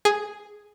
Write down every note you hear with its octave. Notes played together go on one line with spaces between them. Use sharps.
G#4